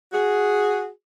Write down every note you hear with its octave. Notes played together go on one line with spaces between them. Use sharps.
F#4 G#4